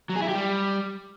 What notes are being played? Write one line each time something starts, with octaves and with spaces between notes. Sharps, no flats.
F#3
G#4
E4
G4
G3